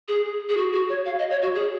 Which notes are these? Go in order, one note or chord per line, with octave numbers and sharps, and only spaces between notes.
G#4
G#4
F#4
F#4
C#5
F5
D#5
C#5
F#4
G#4